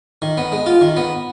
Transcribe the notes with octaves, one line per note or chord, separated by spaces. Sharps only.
D#3
B3
G#3
F4
D#3
B3